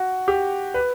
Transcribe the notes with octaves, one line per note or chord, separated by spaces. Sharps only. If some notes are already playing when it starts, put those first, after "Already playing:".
Already playing: F#4
G4
B4